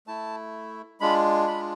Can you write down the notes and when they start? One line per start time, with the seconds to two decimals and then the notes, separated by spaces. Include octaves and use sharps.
0.07 A3 E4 A5
1.00 G#3 D4 F4 B5
1.47 B5